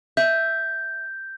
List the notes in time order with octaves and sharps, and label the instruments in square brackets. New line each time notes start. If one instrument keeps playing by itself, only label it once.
[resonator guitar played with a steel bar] E5 [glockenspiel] G6